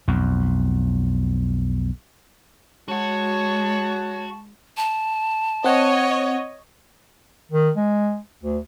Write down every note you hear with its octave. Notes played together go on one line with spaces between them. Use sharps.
B1 F2
G#3 F#4 C#5 F#5 A5
A5
C4 C#5 D#5 F#5
D#3
G#3
D2